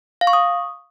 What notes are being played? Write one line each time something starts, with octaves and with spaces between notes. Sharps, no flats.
F5
C#6
D#6